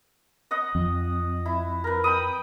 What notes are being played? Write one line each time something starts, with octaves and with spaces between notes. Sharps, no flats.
D#5 F#5 D#6
F2
E4
A#4 B4
G5 B5 D#6